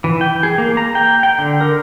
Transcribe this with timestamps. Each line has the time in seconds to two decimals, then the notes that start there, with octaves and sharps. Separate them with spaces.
0.04 E3
0.21 G5
0.43 G#4
0.58 A#3
0.77 A#5
0.95 G5
1.23 G5
1.38 D3
1.61 A#4